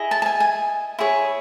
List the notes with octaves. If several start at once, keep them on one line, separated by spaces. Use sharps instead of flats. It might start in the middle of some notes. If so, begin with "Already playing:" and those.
Already playing: E4 G#4 D#5
A5
A5
G#5
G#5
E4 G#4 C#5